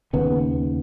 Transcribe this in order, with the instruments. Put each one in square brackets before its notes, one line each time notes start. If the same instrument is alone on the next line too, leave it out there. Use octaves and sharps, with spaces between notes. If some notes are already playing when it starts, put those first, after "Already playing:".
[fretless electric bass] D#2 C#3 B3